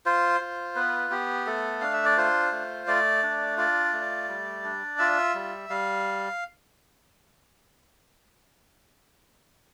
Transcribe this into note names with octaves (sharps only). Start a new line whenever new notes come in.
F4 C5
F4
B3 B4
B3 G4
A3 A4
D4 F5
E5
D5
F4 C5
A3
A3 D5
D4
F4 D5
A3
G3
D4
F4 E5
G3
G3 F5